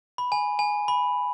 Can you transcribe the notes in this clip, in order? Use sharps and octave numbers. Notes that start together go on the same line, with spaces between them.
B5
G#5
G#5
B5